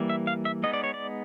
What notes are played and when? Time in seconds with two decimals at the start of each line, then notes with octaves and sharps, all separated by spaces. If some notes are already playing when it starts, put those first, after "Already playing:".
Already playing: E3 G3 A#3
0.09 E5
0.27 F5
0.45 E5
0.63 G#3 B3 D#4 D#5
0.73 D5
0.84 C#5
0.94 D5